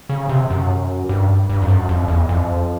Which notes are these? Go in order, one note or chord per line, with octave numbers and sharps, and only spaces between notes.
C#3
C3
F#2
G2
G2
F2
F#2
F2
E2
F2